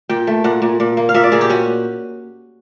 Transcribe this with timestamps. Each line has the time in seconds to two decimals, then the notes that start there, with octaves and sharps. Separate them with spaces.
0.09 A#2 G5
0.27 A3
0.44 A#2 F#5
0.62 A#2
0.80 A#2
0.97 A#3
1.09 F5
1.14 A#2 E5
1.24 D5
1.32 A#2 G#4
1.41 G4
1.50 C#4 F#4